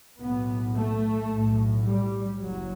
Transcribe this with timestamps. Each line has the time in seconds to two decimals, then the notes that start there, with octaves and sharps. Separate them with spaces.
0.20 B1 A2 B3
0.75 A3
1.30 B1 A2
1.84 G3
2.39 F#1 F#2 F#3